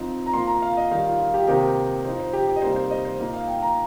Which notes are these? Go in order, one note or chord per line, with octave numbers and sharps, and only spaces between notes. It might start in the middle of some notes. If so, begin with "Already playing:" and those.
Already playing: F3 C4 D#4
A#5
A#2 F3 A#3 C6
A#5
F5
D#5
D#3 G3 D#4 F5
F4
F4
G4
C3 D#3 A#3 D#4 G4
F3 D#4 C5
C5
G4
G4
D#5
C3 G3 A#3 D#4 C5
C5
D#5
C5
A#2 A#3 D#4
F5
G5
A#5